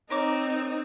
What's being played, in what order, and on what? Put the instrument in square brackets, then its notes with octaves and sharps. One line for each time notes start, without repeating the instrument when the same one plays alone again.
[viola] C4 D#4 [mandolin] A#4 C#5 D6